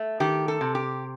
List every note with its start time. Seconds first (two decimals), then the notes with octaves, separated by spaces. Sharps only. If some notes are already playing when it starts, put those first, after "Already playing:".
Already playing: A3
0.20 D#3 G4
0.48 A4
0.61 C3
0.75 G4